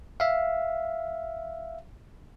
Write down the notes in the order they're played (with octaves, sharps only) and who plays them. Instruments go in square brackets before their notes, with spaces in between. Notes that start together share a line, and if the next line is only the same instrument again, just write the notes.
[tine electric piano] E5 F5